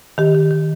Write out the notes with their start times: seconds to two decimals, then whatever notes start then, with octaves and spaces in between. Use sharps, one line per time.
0.18 D#3 G4
0.35 D#3
0.51 D#3